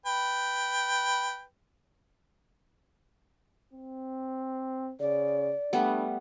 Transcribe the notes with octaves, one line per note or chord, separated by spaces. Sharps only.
B4 G5
C4
C#3 D5
G3 A3 B3 D4